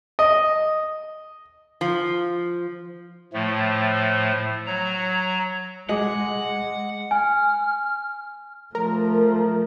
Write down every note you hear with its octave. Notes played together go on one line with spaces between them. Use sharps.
D#5
F3
A2 F3 A3
F#3 A#5
G#3 G#4 D#5 F#5 D6
G#5 F6
F3 A3 A#4